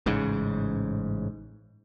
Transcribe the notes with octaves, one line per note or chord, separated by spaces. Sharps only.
A1 G#2 C#3